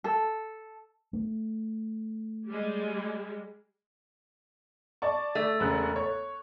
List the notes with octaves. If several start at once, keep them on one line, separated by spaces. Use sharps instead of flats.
A4
A3
G3 G#3
D5 A5 C#6
A3
E1 C#3 F#6
C#5